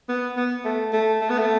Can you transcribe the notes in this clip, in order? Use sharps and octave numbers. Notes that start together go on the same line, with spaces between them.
B3
B3
A3
A3
A3
B3
A3